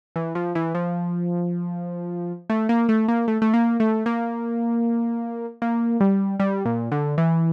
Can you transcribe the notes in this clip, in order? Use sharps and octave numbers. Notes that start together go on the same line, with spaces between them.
E3
F3
E3
F3
A3
A#3
A3
A#3
A3
A3
A#3
A3
A#3
A#3
G3
G3
A#2
D3
E3